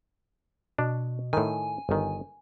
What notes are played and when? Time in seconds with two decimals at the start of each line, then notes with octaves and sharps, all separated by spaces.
0.78 B2 D4
1.33 A2 D#3 G#5
1.89 G1 D#3